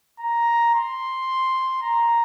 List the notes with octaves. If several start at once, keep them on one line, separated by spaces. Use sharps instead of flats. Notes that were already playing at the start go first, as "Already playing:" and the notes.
A#5
C6
A#5